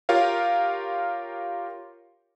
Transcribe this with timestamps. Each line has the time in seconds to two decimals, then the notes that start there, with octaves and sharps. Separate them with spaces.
0.09 F4 G4 A#4 C#5 F5